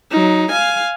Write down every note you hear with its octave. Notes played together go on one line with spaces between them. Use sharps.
F#3 D#4
F5 G#5